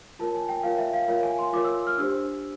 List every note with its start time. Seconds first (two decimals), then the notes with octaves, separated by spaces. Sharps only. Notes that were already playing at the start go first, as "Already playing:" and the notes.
0.19 F4 A#4 C#5 A5
0.35 G#5
0.49 G5
0.63 F4 A#4 C#5 F5
0.78 E5
0.93 F5
1.08 F4 A#4 C#5 F5
1.23 G#5
1.39 C6
1.53 F4 A#4 C#5 D6
1.65 E6
1.87 F6
1.98 D4 G4 C5 E6